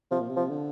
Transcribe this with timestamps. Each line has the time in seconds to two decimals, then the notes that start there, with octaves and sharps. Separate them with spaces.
0.11 C3 F3
0.20 A#2
0.29 C3
0.36 F3
0.50 D3